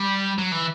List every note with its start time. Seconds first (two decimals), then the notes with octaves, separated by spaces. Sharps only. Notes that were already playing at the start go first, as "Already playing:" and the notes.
Already playing: G3
0.38 F#3
0.52 E3